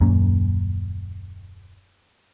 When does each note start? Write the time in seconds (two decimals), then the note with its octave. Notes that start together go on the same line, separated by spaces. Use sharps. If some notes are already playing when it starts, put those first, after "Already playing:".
0.01 D#1 F#2 A#3 C#4